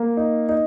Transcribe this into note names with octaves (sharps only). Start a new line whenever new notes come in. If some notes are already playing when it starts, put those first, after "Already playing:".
Already playing: A#3
D#4
D#4